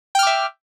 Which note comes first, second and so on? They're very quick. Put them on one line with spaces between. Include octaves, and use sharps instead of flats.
G5 F6 D6 E5